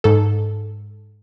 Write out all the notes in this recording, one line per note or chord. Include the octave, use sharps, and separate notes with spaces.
G#2 A4